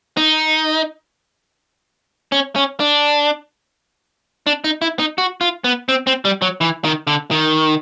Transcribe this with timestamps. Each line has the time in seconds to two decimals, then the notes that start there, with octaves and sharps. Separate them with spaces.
0.17 D#4
2.32 C#4
2.56 C#4
2.80 D4
4.47 D4
4.64 D#4
4.82 E4
4.99 D#4
5.18 F#4
5.41 F4
5.64 B3
5.89 C4
6.07 C4
6.25 G3
6.42 F#3
6.61 E3
6.84 D#3
7.07 D3
7.31 D#3